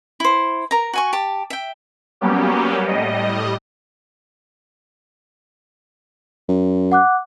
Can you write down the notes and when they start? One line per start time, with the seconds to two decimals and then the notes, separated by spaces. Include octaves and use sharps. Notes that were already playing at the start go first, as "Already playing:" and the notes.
0.20 E4 C5
0.71 A#4 A#5
0.93 F#4 G#5 C#6
1.13 G4 A5
1.50 E5 G5
2.21 F#3 G3 A#3 B3 C#4 G4
2.87 A2 G3 D#5
6.49 F#2
6.92 F#5 D6 F#6